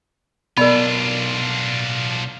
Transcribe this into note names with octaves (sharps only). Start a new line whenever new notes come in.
B1 B3 D4 F4 A#4 D5 D#5